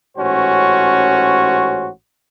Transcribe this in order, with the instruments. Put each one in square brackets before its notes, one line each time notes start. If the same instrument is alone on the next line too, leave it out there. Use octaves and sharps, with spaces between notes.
[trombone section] A1 G#2 C#4 F#4 C5